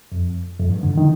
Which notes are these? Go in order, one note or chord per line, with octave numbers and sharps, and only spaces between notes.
F2
F2
G2
D3
D#3